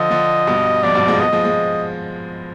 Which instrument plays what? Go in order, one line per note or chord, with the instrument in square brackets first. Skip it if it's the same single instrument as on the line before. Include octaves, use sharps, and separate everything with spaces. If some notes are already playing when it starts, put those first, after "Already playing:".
Already playing: [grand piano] D3 F3 [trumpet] D#5
[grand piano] D3 F3
G2 B2
[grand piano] F2 G#2 [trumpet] D5
[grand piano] G2 B2
F3 G#3
[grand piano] G3 B3 [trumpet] D#5
[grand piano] F3 G#3
F3 G#3